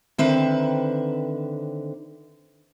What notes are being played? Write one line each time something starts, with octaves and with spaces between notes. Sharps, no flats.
D3 D#3 C4 B4 E5